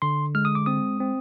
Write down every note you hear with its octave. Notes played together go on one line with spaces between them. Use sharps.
D3 C6
G#3 F6
D#6
D6
C4 D#6
C4